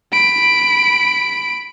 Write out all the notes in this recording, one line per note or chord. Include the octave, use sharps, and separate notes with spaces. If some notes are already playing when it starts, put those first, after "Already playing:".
B5 D7